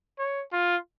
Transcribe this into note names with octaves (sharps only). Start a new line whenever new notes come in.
C#5
F4